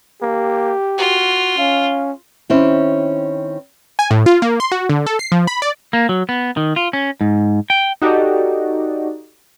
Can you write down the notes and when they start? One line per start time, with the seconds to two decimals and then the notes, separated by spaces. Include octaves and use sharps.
0.22 A#3 G4
0.98 F4 F#4
1.58 C#4 F5
2.50 D#3 C4 C#4 E4 C5
3.99 G#5
4.11 A2
4.26 F4
4.42 A#3
4.60 C6
4.72 F#4
4.89 D3
5.07 A4
5.19 C7
5.32 F3
5.47 B5
5.62 D5
5.93 A#3
6.09 F#3
6.29 B3
6.57 D#3
6.76 F4
6.93 C#4
7.21 G#2
7.70 G5
8.02 D#4 F#4 G4 A4 D5 D#5